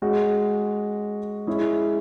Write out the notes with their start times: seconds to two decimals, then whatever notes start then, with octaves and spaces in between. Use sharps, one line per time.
0.02 G#3 C#4 F#4
1.47 G#3 C#4 E4 G#4